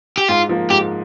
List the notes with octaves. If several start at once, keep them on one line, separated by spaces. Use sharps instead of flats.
G4
G#2 F4
F3 A#3
G#2 G4